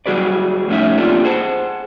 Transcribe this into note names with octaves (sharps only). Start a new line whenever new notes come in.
F#3 G3 F#4 G#4 B4 D5
F2 A2 A3 C#4 D#4 E5
A#3 C4 D4 F4 G4 A4
G#4 C5 F#5 G#5 A5